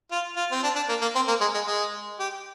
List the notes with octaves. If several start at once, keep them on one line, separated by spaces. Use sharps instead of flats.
F4
F4
C4
D4
D4
A#3
A#3
C4
A#3
G#3
G#3
G#3
G4